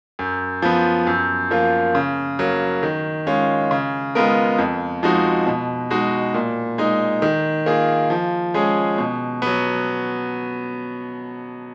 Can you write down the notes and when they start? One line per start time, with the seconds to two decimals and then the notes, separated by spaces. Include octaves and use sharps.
0.19 F#2
0.62 F3 B3
1.07 F#2
1.51 F3 A#3 F4
1.95 C#3
2.39 F#3 A#3
2.83 D#3
3.27 G#3 C#4 F4
3.71 C#3
4.15 G#3 B3 F4 A#4
4.58 F2
5.03 F3 G#3 D#4 F#4
5.46 B2
5.90 G#3 D#4 F#4
6.34 A#2
6.78 G#3 D#4
7.22 D#3
7.66 A#3 F4 G#4
8.10 F3
8.54 G#3 C#4 G#4
8.98 B2
9.42 F#3 B3